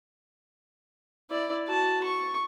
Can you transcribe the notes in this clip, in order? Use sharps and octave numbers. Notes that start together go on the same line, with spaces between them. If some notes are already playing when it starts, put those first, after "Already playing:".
E4 D5
F#4 A5
C#6